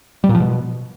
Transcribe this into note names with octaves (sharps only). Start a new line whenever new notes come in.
G3
A#2
F3
B2